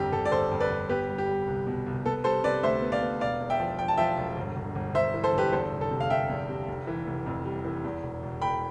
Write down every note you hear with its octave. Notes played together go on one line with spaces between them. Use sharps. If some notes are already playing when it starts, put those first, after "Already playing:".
Already playing: G1 F2 G4
G1 A4
D5
G1 A4 C5
F2
B4 D5
G1
B3 G4 B4
G3
G4
G3
C2
B2
C2
B3 A4
G3 A4 C5
C3 B4 D5
D2 C5 E5
B3
D5 F5
B3
E1 D5 F5
E2
E5 G5
F3
F3 G5
A5
F3 E5 G5
E1
G1
G1
G1
G1 C5 E5
E3
A4 C5
G1 G4 B4
E2 A4 C5
F1
A4
C3
F5
C3 E5 G5
E2
C3
F1
E3
F1
F2
G3
E3
E2
E1
E1
E1 G5 B5